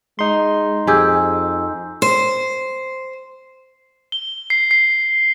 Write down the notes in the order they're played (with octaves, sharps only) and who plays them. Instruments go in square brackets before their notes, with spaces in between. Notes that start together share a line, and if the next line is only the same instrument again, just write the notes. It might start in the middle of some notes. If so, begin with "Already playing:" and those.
[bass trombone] G#3 [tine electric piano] D#4 C6
[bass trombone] F2 [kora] G4 G#4 [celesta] G#5 E6 G6
[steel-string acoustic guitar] C5
[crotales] G7
C7
C7